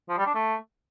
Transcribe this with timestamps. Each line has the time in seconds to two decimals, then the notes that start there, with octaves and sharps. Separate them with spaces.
0.09 F3
0.18 G3
0.26 D4
0.35 A3